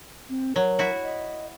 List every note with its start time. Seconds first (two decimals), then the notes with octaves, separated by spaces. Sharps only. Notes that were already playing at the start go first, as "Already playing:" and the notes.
0.29 C4
0.56 F#3 A#4
0.79 E4 F#4
1.04 D#5